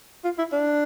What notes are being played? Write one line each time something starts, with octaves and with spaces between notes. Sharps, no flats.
F4
E4
D4